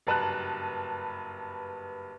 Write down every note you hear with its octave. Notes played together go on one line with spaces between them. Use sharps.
F#1 G2 B4 A5 A#5 F#6